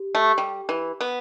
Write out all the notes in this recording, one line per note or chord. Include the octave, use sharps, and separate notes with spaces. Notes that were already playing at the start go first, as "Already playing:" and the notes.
Already playing: G4
A3
G3
E3
B3